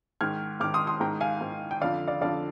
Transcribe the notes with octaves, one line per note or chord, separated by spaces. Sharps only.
G#2 D#3 F6 G#6
G#2 D#3 D6 F6
C6 D#6
C6 D#6
G#2 D#3 G5 A#5
F5 G#5
G#2 D#3
G5
F2 D3 D5 F5
D5 F5
F2 D3 D5 F5